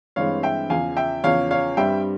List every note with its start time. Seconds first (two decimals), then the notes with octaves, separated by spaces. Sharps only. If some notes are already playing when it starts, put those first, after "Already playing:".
0.16 G2 E3 G#3 C4 C#5 F5
0.43 E5 G5
0.70 E2 C#3 F3 F5 G#5
0.97 E5 G5
1.24 E2 C#3 F3 C#5 F5
1.51 C#5 F5
1.77 G2 G3 C4 E5 G5